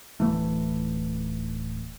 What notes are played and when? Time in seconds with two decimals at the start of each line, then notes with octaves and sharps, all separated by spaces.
0.20 D1 F2 E3 A3